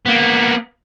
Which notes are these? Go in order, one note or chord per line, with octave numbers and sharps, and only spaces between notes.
A#3 B3